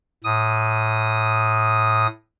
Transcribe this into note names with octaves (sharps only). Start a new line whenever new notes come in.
A2 D#6